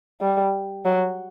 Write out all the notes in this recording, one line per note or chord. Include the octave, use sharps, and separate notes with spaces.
G3
F#3